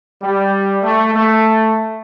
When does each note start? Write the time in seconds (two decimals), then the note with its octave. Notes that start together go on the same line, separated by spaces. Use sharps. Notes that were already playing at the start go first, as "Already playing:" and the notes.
0.22 G3
0.83 A3
1.14 A3